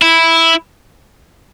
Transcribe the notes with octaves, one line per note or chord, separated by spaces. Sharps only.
E4